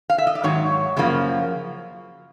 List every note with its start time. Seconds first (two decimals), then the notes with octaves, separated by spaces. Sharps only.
0.10 F5
0.18 E5
0.27 D#5
0.35 D5
0.43 G#2 D#3 F#3 C#5
0.97 F#2 C#3 F3 A#3